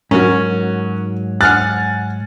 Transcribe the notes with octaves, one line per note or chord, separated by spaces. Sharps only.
G#2 F#3 C#4 F#4 A#4
F#5 G#5 F6 F#6 A6